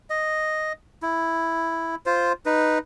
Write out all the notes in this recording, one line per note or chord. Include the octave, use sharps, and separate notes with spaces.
D#5
E4
F4 C5
D#4 B4